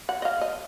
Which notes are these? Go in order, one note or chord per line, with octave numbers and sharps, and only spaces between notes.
F#5
D#5
F5
D#5